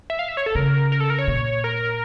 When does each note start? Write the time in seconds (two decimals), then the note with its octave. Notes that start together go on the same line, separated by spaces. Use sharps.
0.10 E5
0.19 F5
0.29 E5
0.37 C#5
0.46 A4
0.55 C#3 A#4
0.92 A#4
1.00 A4
1.10 A#4
1.19 C#5
1.28 A#2
1.64 A#4